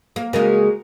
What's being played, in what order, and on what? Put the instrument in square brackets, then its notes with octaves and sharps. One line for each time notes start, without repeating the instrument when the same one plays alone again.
[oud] A#3
[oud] C#3 G#3 A#3 [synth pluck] F#4 A#4